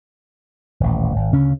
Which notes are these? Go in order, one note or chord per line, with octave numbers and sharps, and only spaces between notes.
D#1 A1
G#1
D2 C#3 C#4